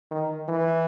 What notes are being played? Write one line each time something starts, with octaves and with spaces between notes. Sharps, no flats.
D#3
E3